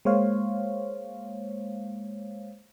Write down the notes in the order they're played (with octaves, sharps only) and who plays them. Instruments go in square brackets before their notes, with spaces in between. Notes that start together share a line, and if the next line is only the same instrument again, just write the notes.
[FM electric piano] G#3 A#3 C5 C#5 F5